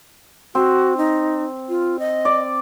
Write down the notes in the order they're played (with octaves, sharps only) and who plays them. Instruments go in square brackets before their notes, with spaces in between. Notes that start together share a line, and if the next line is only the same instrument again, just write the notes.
[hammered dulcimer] C4 [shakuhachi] F#4
[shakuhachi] D#4
F4
D#5
[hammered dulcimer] D5